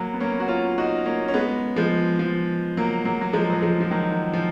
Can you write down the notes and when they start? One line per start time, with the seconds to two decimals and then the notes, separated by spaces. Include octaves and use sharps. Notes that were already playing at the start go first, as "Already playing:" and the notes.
Already playing: F#3 A#3
0.14 B3
0.20 A#3 C#4
0.40 F#4
0.48 C#4 F4
0.78 D#4 F#4
1.06 A#3 C#4
1.28 C#4
1.34 G#3 B3
1.76 F3 G#3
2.19 F3
2.77 F#3 A#3
3.05 F#3 A#3
3.21 F#3
3.33 F3 G#3
3.50 F#3
3.62 F3 G#3
3.80 F3
3.91 D#3 F#3
4.33 F3